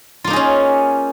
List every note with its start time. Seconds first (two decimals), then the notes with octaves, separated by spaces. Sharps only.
0.24 F4
0.27 A#3
0.30 D#4
0.33 G#4
0.36 C#4